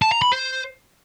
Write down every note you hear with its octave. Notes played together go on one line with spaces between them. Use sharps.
A5
A#5
B5
C5